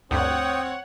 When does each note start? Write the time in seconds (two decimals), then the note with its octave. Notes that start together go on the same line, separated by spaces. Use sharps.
0.11 D2 G2 C4 C#5 F#5 G5 D#6